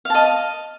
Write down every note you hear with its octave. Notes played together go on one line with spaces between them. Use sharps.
D#5 F5 A5